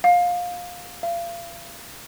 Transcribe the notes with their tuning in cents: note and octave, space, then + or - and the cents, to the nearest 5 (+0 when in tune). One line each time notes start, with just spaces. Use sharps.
F5 +20
F5 -35